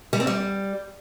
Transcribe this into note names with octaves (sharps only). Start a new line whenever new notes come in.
G3
C4
G3